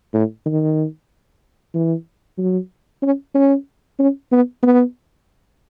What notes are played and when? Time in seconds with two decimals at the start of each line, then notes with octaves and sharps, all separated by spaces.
0.14 A2
0.46 D#3
1.75 E3
2.38 F#3
3.03 C#4
3.35 C#4
3.99 C#4
4.32 B3
4.63 B3